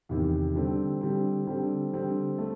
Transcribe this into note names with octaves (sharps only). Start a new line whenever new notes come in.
E2 C3 D#3
D3 G3 C4
D3 G3 C4
D3 G3 C4
D3 G3 C4
A3